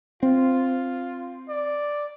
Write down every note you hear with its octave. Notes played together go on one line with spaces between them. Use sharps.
C4 F4
D5